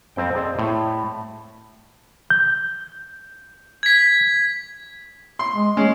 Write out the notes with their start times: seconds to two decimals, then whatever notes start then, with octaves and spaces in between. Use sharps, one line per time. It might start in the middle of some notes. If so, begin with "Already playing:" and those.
0.16 F2 C4 G5
0.35 C4 G#4 D5 D#5
0.59 A2
2.30 G6
3.83 G#6 B6
5.39 C6
5.54 G#3
5.77 G#3 C#4